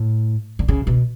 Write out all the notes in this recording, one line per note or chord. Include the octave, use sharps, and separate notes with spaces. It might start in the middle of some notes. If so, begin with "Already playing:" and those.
Already playing: A2
D3
C#3
B2